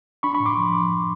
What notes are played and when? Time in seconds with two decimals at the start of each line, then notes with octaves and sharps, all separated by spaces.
0.23 D4 B5 C#6
0.34 B5 C#6
0.40 A2
0.45 C6 D6
0.57 F3